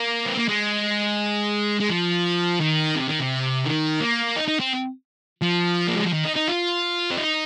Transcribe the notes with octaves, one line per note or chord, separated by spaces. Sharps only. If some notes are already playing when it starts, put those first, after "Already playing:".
Already playing: A#3
C4
A#3
G#3
G#3
F3
D#3
C3
D#3
C3
D#3
A#3
D#4
D#4
C4
F3
A#3
G#3
F3
D#3
D#4
D#4
F4
C4
D#4